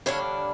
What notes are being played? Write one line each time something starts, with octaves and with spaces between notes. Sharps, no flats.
G2 D3 A#3 D4 C#5